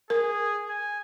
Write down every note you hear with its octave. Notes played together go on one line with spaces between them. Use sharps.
G#4 A#4
G#5